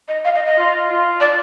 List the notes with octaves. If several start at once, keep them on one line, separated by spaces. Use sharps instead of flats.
D#5
F5
D#5
D#5
F4
F4
D5